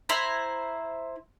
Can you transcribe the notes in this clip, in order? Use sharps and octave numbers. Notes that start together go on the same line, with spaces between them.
E4 C5 A#5